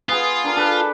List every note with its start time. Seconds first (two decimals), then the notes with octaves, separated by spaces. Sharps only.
0.09 B3 F4 G#4
0.44 D4 A#4
0.56 D4 A4 B4